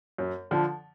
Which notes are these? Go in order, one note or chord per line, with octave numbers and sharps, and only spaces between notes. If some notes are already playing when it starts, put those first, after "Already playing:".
F#2
D3 F3